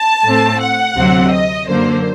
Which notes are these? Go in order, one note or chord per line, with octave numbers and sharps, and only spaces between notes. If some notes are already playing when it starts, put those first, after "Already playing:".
Already playing: A5
A2 A3 C4
F#5
D2 C3 F#3 C4
D#5
F#2 D3 F#3 A#3 C5